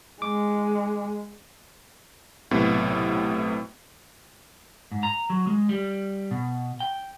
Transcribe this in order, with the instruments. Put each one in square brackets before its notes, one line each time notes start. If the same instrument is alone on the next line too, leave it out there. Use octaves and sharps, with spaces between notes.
[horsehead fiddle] G#3 [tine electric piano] D6
[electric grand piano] B1 A2 C3 B3
[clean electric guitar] G#2
A#5
F#3
G#3
G3
B2
G5